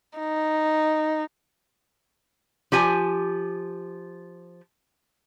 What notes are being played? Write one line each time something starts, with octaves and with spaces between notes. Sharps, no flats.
D#4
F3 G4 G#5